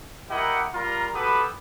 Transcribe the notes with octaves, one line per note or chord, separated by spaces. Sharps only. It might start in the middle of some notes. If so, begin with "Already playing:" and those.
E4 G4 A#4 D#5 F#5
G3 F4 A#4 A#5
F#4 G4 A4 B4 B5 D#6